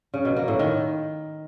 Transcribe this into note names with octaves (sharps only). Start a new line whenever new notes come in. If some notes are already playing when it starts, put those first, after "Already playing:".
C#3
B2
A#3
A2
D#3